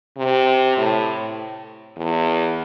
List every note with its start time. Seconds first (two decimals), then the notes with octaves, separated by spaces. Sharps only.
0.17 C3
0.77 A2
1.97 E2